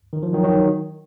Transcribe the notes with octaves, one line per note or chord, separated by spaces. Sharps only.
D#3
F3
D#3 F#3
D#3 F#3